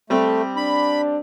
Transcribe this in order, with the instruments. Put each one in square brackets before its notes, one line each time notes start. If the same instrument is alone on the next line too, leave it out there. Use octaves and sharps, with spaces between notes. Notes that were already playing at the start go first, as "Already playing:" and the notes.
[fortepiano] G3 C4 G4 [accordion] A3
[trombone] D4 [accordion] B5